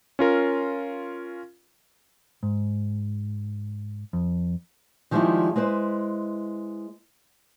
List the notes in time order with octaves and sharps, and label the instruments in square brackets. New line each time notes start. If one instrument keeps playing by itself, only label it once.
[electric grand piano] C#4 F4 A#4
[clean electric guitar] G#2
F2
[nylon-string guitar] D#3 F3 G3 G#3 D#4 E4
G#3 E4 B4 C5